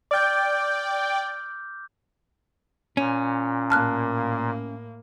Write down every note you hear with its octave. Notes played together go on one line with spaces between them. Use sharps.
D5 G5 D6 F6 G6
A#2 C#4
A2 A#3 A5 F6 F#6